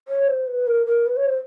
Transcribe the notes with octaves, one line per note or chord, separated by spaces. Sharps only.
C#5
C5
B4
A#4
A#4
B4
C#5
C5